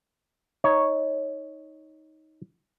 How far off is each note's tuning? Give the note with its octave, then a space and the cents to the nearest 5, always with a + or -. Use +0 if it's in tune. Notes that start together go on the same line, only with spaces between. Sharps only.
D#4 +15 C#5 +0